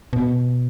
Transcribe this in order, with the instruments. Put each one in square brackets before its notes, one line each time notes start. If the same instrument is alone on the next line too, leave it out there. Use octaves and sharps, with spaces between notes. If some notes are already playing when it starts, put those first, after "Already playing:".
[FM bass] B2